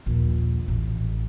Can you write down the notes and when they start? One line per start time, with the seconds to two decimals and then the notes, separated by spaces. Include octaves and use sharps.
0.06 A#1 D#2
0.68 A1